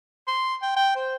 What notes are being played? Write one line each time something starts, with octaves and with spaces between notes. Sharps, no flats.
C6
G5
G5
C5